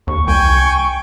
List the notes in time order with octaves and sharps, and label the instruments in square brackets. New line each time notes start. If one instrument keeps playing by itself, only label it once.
[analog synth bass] D#2 [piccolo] C#6
[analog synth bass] C2 [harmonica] G5 G#5